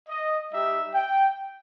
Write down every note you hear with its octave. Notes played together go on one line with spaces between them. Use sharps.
D#5
G3 D#4 G4 E5
G5